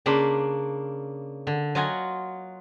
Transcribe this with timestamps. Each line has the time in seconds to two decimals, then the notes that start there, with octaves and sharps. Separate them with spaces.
0.06 C#3 A#3 D4 B5 C6
1.47 D3
1.75 F#3 F4 D#5 F#5 G#5